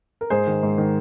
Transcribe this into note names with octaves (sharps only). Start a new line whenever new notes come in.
A#4
G#2 G#4 C5
D#3
G#2
D#3